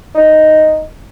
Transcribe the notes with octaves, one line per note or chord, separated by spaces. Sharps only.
D#4